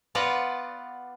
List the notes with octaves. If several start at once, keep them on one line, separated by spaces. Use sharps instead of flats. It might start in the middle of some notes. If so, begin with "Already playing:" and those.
B3 F4 B4 D5 F#5 A#5